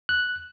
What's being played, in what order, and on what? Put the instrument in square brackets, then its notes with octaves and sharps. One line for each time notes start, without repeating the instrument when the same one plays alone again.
[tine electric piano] F#6